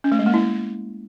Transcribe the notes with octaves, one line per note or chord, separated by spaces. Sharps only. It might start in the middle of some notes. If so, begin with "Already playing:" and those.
C#4
A3
G#3
A#3
E4